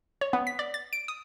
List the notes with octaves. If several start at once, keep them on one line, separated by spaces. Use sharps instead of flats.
C#5
B3
B6
D5
A6
D7
D#6